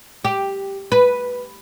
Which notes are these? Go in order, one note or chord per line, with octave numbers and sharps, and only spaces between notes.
G4
B4